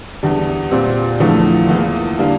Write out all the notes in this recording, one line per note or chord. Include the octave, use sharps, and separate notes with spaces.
E2 D3 G3
A#2 G3 C4
E2 D3 F3 A3 E4
E2 E3 A#3 F4
D3 G3 A#3